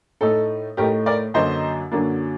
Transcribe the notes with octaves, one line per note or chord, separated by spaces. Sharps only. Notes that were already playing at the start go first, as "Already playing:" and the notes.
A2 A3 D#4 A4
A2 A3 D#4 G4 A#4
A#4 D5
F#2 D3 F#3 A#3 D4 C5 D#5
F#2 D3 F#3 A#3 D4